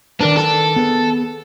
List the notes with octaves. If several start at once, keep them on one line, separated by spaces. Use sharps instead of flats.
D#3 D4 A#4 B4
A4
B3 G#4 B4